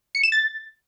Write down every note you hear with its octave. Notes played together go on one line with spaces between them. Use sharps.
C#7
E7
A6